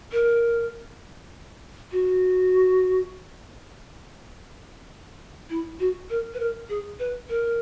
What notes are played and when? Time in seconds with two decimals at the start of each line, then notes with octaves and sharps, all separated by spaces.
0.12 A#4
1.92 F#4
5.50 E4
5.80 F#4
6.10 A#4
6.34 B4
6.40 A#4
6.69 G#4
6.99 B4
7.29 A#4